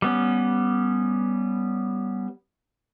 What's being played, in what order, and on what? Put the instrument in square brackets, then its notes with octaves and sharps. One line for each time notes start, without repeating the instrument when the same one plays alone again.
[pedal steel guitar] G3 B3 C#4